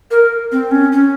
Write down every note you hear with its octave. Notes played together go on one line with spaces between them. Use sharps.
A#4
C4
C#4
C#4